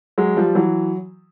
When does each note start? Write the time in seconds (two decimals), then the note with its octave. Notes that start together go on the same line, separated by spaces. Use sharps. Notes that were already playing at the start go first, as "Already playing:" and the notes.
0.18 F#3 G#3
0.37 F3 G3
0.55 E3 F#3